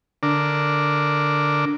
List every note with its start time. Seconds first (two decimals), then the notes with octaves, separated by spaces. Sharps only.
0.23 D3 D4 A#4